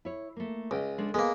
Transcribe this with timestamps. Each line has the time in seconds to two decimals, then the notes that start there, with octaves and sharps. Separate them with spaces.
0.05 E4 C#5
0.36 A3 A#3
0.71 C#2 D#5 G5
0.98 G#3 D4 A4
1.14 G#3 A#3 B3 A#4